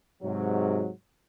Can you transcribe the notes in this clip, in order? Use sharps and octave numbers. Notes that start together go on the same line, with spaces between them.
G#2 C3 F#3